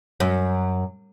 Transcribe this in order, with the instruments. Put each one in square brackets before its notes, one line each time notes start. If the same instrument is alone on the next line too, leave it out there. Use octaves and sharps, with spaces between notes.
[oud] F#2